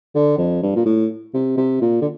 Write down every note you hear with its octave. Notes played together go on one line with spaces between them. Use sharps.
D3
F2
G2
A#2
A2
C3
C3
A#2
D3